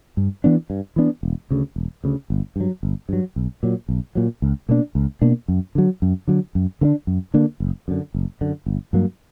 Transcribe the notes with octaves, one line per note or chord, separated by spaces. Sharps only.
G2
E3 B3 D4
G2
E3 B3 D4
E1
D2 C#3
E1
D2 C#3
G1
G2 F#3
G1
G2 F#3
B1
A#2 F#3
B1
A#2 F#3
C#2
B2 A#3 D4
C#2
B2 A#3 D4
F#2
D3 F#3
F#2
D3 F#3
F#2
D3 A#3 D4
F#2
D3 A#3 D4
F#1
F#2 D3
F#1
F#2 D3
G1
G2 F#3 A#3